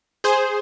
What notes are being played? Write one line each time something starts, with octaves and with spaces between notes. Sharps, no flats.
G#4 C5